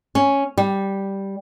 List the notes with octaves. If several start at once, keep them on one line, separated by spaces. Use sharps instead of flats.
C#4
G3